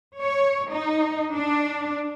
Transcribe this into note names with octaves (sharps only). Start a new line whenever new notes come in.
C#5
D#4
D4